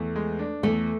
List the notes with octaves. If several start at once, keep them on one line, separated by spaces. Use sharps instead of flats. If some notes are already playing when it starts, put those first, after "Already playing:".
Already playing: E2 A3
G#3
D4
E2 A3